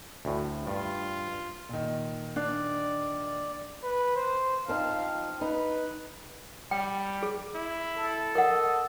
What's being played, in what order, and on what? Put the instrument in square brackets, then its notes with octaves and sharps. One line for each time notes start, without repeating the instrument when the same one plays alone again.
[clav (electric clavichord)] D2 A2
[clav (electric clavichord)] G2 [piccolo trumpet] F4
[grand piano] A#2 D#3
[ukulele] D4 [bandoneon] D5
[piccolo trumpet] B4
C5
[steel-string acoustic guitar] F3 C4 D#4 [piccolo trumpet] F5
[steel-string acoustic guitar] D#4 [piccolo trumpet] B4
[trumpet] G3 [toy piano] G5
[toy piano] G#4
[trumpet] E4
[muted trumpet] A4
[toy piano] A#4 F#5 [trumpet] D#5